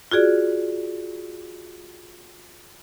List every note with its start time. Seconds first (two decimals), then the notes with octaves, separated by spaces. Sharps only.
0.11 F4 F#4 G#4 D5